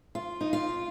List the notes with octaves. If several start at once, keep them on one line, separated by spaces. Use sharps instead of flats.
F4
D#4
F4